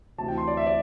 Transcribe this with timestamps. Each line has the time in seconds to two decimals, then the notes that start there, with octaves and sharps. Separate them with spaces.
0.18 D2 C3 E3 A5
0.28 G5
0.38 C6
0.48 D5
0.57 E5
0.67 D5